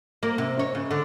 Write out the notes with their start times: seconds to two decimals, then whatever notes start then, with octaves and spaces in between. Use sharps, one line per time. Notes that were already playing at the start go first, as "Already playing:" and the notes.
0.23 A#3
0.38 C3
0.59 C#5
0.75 C#3
0.91 D3